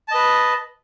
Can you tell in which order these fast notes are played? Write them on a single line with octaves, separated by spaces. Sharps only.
A5 D#5 B4